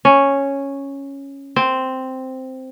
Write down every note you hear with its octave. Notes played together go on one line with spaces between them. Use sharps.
C#4
C4